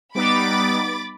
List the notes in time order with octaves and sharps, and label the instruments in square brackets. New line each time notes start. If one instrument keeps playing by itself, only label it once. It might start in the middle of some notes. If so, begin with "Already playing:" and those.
[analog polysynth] G3 B3 D#4 [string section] B5 D6 A6